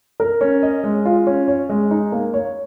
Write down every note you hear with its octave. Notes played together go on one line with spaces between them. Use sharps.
A#4
C#4
D#5
G#3
F4
C#4
C#5
G#3
D#4
A#3
C#5